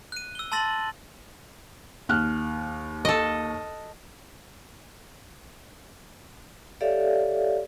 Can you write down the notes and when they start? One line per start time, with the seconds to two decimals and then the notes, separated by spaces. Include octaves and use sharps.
0.12 F#6 D#7
0.35 E6 G7
0.52 A5 C6 E6 A6 A#6 F#7
2.09 D#2 F6 F#6
3.05 A4 D#5
6.81 G4 A4 C#5 D5 E5 F5